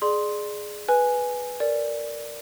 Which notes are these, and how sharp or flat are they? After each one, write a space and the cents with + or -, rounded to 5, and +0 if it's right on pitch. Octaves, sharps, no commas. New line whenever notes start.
G#4 +10 D5 +25 C6 +0
B4 +0 G#5 +0
A#4 -15 D5 +0